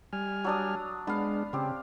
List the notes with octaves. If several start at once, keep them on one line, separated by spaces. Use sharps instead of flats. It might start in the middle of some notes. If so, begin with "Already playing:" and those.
G3 G#5 F6
F#3 D4 D#6
G#3 B3 D4 F5
C#3 C4 G4